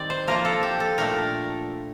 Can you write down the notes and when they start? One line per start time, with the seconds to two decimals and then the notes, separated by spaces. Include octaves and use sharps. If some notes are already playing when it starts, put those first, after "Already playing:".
Already playing: D#3 G3 C4 D5
0.10 C5
0.27 F3 A#3 F4 A#4
0.45 A4
0.63 G4
0.80 A4
0.98 A#2 A3 D4 A#4